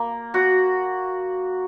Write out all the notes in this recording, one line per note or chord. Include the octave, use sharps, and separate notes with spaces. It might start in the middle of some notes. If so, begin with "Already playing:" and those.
Already playing: A#3
F#4